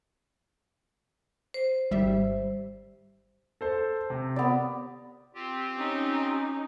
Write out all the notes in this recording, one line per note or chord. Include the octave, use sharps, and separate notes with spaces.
C5
G#1 G3 E5
A4 C5 A5
C3
B3 D5
C4 F4 G4
C#4 D#4